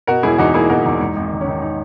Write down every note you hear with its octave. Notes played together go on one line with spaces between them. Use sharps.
B2 F#4 A#4
E1 E4 G#4
E2 D#4 F#4
A#3 E4 G#4
B2 F#4 A#4
E2 D#4
G#2 D#4
G#1
D#3
C#4
D#3 D#4
D#4